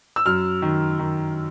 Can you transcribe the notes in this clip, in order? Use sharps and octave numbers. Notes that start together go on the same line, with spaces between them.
E6
F#2 F6
D#3
D#3